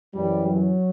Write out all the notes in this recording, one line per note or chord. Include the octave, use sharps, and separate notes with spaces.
F#2 E3 G3
F#3